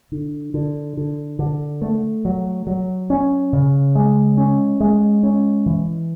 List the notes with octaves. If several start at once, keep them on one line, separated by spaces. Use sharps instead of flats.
D3
D3
D3
D3
A3
F#3
F#3
C#4
C#3
G#3
C#4
G#3
C#4
E3